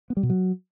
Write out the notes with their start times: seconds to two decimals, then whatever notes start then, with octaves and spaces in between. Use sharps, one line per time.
0.10 B3
0.17 G3
0.23 B2
0.30 F#3